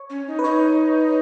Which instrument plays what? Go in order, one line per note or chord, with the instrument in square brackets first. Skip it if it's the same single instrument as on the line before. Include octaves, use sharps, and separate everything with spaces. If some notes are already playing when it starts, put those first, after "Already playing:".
Already playing: [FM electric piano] C#5
[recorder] C#4
D#4
[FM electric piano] B4
[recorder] D#4 [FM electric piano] C#5